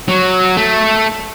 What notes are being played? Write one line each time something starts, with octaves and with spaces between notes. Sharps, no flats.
F#3 F#4
A3